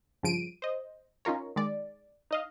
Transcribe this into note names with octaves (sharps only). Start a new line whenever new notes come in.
G2 C#3 F3 D7 D#7
C5 D#5
C#4 D#4 F4 A#4 C#5
D#3 G#3 D5
D#4 D#5 F5